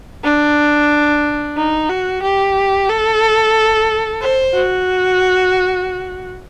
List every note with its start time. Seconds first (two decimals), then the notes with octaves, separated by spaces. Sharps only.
0.24 D4
1.57 D#4
1.89 F#4
2.22 G4
2.89 A4
4.21 C5
4.54 F#4